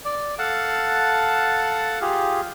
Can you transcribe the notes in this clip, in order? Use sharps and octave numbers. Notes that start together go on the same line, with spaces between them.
D5
A4 F5 F#5 A5
F4 G4 G#4